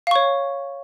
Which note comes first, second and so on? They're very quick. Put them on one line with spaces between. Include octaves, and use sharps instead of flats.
F5 C#6 C#5